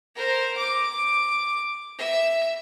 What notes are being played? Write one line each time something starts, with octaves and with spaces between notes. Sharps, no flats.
A#4 C5
D6
E5